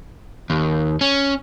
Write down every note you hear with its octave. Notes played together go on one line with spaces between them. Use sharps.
D#2
C#4